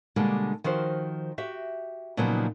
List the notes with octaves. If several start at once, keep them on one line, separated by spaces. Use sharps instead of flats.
B2 D3 G3 G#3 A#3
D#3 F3 F#4 C5
F#4 G4 E5
A#2 C#3 F3 F#3 B3 D#4